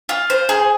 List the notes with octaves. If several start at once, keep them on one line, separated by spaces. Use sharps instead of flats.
F4
C5
G#4